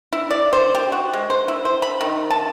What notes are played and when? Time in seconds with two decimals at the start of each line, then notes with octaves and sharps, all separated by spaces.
0.13 E4
0.31 D5
0.53 C5
0.75 G4
0.92 F#4
1.13 G#3
1.30 C5
1.48 E4
1.65 C5
1.82 B5
2.01 D#3
2.30 A5